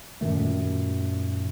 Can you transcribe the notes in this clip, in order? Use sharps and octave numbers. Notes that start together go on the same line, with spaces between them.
F#2 A#2 D#3 A3